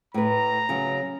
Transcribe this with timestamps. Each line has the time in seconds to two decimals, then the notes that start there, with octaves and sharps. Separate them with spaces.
0.14 A2 B4 A#5
0.69 C#3 F#3